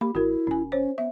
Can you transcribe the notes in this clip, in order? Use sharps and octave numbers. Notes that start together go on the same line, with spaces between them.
A#3 G4 B5
A1 E4 F#4 A#4
E1 C#4 G#5
C#4 C5 C#5
B3 E5